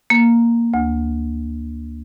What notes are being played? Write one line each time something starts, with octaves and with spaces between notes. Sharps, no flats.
A#3
D2